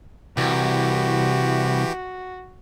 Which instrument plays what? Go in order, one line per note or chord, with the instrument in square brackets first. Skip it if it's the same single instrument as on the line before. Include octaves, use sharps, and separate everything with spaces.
[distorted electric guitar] C2 [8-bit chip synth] E3 G4 [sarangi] F#4